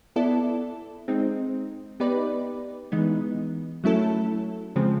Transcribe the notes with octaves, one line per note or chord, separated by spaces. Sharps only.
B3 E4 A4 D5
G#3 C4 D#4
B3 D#4 G4 B4 D5
E3 G#3 B3 D#4
F#3 A3 C#4 E4 A4
C#3 F3 G#3 C4